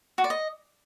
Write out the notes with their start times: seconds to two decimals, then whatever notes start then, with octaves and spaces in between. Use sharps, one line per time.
0.18 F#4
0.24 D5
0.30 D#5